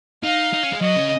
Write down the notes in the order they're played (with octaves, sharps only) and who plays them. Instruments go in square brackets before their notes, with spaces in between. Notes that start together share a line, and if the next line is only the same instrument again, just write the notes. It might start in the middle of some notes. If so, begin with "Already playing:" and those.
[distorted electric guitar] D#4 [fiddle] F5
[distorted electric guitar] D#4
C#4
G#3
[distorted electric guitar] F#3 [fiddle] D#5
[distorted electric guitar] C#3